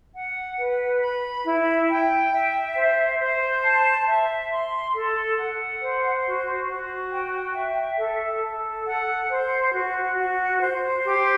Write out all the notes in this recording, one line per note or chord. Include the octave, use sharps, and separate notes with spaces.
F#5
B4
B5
E4
G5
E5
C5
C5
A5
E5
C6
A4
F#5
C5
F#4
F#4
G5
E5
A4
A4
F#5
C5
F#4
F#4
C5
G4